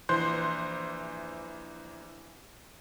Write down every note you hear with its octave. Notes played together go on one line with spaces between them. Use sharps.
A#1 E3 C5 C6 F#6 G6